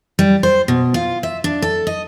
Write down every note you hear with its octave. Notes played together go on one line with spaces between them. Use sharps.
G3
C5
B2
F4
E5
D4
A4
D#5